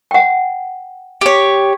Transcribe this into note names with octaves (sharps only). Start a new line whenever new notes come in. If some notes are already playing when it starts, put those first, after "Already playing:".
F#5 G5
G4 C#5